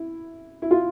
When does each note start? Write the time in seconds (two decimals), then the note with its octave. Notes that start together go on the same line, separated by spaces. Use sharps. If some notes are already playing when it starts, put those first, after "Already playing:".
Already playing: E4
0.62 E4
0.71 F4